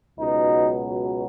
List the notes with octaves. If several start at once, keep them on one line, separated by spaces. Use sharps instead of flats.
C#2 B2 F#3 D#4